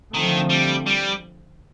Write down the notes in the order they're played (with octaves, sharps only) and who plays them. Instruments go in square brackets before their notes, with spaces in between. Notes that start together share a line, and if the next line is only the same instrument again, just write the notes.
[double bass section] D3 F3 A3 C4 [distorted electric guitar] D#3
[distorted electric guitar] G3
G3